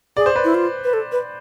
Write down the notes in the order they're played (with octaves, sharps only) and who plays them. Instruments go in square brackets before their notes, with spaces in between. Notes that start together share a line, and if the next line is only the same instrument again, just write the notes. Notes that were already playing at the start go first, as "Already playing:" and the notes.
[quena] G#4 [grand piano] D5
[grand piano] C5
B4 D5
[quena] E4
F4
B4
A4
B4